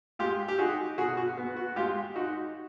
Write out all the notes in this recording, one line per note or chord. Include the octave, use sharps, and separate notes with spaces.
G#3 F4 G4
G4
D#4 F#4 G#4
B2 F#4 G#4
F#4
B3
F#4
G#3 F4 G4
D#4 F#4